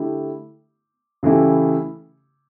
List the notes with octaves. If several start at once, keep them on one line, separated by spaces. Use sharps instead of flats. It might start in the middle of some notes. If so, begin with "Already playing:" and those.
Already playing: D3 A3 E4 G4
C#3 E3 A3 E4 G4